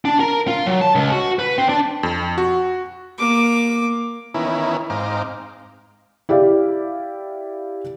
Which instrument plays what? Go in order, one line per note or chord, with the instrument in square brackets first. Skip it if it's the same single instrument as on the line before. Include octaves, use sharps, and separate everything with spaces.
[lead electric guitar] D4
A#4
F4
F#3
A5
C#2
F#4
B4
C4
D4
[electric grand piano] F2
F#4
[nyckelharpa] A#3 D6
[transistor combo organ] D#3 E3 B3 C#4 E4 A#4
G#2 C4 D#4 F5 A#5 D6
[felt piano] E4 G4 D5 F5